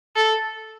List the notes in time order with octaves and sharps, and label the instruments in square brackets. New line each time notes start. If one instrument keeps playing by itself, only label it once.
[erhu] A4